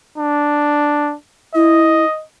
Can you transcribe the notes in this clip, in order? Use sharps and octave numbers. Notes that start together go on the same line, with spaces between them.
D4
E4 D#5